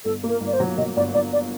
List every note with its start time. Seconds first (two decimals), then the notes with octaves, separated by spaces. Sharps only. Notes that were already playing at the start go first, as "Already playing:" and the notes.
0.05 G1 A4
0.23 A#3
0.29 A#4
0.41 G1
0.47 D5
0.53 C5
0.60 F#3
0.77 F#3 D#5
0.96 G1 D5
1.14 G1 D5
1.33 D5